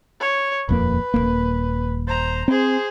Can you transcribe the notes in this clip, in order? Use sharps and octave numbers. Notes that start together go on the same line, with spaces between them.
C#5
D#1 F2 A#3 B4
D#1 G#1 A#3
C5 A#5
C4 G#4 C5